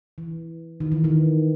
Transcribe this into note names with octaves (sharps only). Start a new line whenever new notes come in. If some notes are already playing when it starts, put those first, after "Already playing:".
E3
D#3
E3
D#3